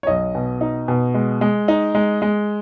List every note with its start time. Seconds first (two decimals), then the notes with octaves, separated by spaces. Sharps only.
0.03 C#5
0.07 B1 D#5
0.35 B2
0.61 D#4
0.88 B2
1.14 G#3
1.41 G#3
1.68 D#4
1.95 G#3
2.22 G#3